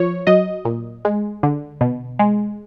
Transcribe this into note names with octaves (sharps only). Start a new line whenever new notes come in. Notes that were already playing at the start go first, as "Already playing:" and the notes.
Already playing: F3 C#5
F#3 D#5
A#2
G#3
D3
B2
G#3